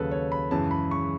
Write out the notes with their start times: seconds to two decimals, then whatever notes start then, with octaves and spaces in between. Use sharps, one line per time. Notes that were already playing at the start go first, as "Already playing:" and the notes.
Already playing: D#2 C#3 F#3 A4 B4
0.11 C#5
0.32 B5
0.51 F#2 C#3 E3 G#3 A5
0.71 B5
0.91 C#6